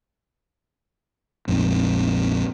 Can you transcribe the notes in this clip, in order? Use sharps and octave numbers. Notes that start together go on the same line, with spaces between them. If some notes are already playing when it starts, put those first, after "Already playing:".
A#1 F2 G#2